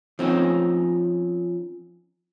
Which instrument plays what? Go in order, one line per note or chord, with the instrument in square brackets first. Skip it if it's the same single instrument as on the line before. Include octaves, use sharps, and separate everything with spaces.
[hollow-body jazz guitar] F3 C4 C#4 D#4